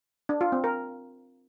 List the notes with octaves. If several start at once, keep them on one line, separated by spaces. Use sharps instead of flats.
D4
F4
C4
A#4